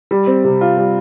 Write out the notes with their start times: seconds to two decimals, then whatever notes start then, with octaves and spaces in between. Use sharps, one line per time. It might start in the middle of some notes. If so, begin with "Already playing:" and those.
0.11 G3
0.27 C4
0.44 C3
0.61 F4
0.77 G3